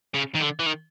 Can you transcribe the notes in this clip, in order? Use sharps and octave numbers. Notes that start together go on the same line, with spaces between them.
C#3
D#3
D3
E3
D#3